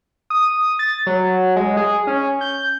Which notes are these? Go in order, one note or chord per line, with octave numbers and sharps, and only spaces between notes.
D#6
A6
F#3
G#3
G#4
C#4
G6